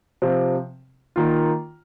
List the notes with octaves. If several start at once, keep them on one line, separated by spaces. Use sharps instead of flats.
C3 F3 C4
D#3 A#3 F4